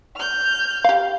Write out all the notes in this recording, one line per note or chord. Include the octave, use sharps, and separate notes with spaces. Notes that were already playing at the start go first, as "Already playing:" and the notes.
F6 G6
G4 F5